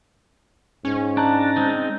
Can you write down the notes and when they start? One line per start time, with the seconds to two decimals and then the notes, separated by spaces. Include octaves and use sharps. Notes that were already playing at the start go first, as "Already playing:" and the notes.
0.85 G#2 C#4
1.17 D4 A5 A#5 F#6
1.57 G#3 C4 D#4